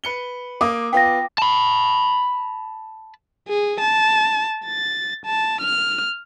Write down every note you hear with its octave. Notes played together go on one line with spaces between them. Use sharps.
B4 C#7 G7
A#3 D6 D#6
B3 F4 G5 A#6
A5 B5
G#4
A5
A6
A5
F6